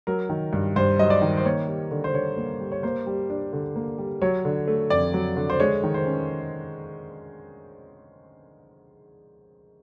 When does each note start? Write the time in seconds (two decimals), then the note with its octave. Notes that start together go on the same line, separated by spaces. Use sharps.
0.07 F#3 A#4
0.30 D#3
0.53 G2
0.76 G2 C5
0.99 F#3 D#5
1.10 D5
1.22 D#3
1.37 C5
1.45 A#3 C#5
1.68 G3
1.91 D3
2.04 C5
2.14 D3 C#5
2.37 A#3
2.60 G3
2.72 C#5
2.83 A#3 C5
3.06 G3
3.30 D4
3.53 D3
3.76 A#3
3.98 G3
4.22 F#3 C#5
4.45 D3
4.67 A3
4.90 F2 D5
5.14 F#3
5.36 D3
5.50 C5
5.60 G#3 C#5
5.84 D#3
5.94 C5
6.06 C#4